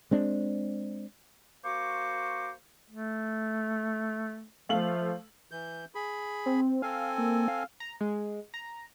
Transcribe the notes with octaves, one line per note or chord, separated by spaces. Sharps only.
G#3 C4 D4
A#3 F#4 C5 C#6 D6
A3
F3 A3 F5 F#7
E3 G6
G#4 B5
C4
C4 A4 F5 G#5
A#3
F5
A#5
G#3
A#5